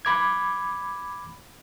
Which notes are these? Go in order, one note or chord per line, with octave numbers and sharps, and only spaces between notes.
B5 D6 G#6